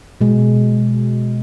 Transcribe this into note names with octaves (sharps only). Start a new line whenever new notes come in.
B2 G#3